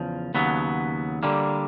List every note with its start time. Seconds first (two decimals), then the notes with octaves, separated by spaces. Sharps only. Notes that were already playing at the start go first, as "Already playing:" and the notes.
Already playing: E2 C#3 F3
0.34 D#2 C#3 F#3 B3
1.23 D3 G3 A#3